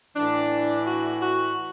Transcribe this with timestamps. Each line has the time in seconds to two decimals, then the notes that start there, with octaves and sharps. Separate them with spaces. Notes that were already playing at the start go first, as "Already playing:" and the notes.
0.16 A2 E3 D4
0.86 F#4
1.20 F#4